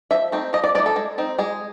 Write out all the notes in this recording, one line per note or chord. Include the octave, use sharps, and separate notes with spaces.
F3 E5
A3 C4 D#4
F3 D#5
D5
A3 C4 D#4 D5
A4
G#3
C4 D#4
G#3 G#4